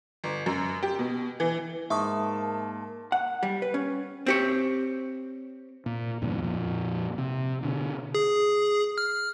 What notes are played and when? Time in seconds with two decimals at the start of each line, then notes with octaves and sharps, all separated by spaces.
0.24 G1
0.46 F#2
0.83 G4
0.99 B2
1.40 E3
1.90 G#2 A#3 E5 A5 C#6 D#6
3.12 F#5
3.43 G3
3.62 B4
3.74 C#4
4.26 C4 G4 C#5
5.86 A#2
6.22 D#2 G#2 B2 F3
6.42 F2 A#2
7.18 C3
7.63 B2 D3
8.14 G#4
8.98 F6